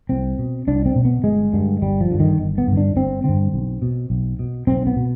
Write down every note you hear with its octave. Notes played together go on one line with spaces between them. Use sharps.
C2 C4
B2
C2 D4
C4
B2
B3
G1 G#3
G2 D3
G1 G3
F3
G2 D3
D#3
G1
B3
G2 D3
D4
G1 C4
G2 D3 C4
B1
B2
B1
B2
B1 C4
B3
B2